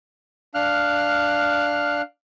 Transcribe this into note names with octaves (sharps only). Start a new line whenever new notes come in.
D4 F5 F6 F#6